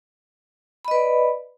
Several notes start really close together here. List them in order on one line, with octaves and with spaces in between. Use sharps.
B5 D#5 B4 D5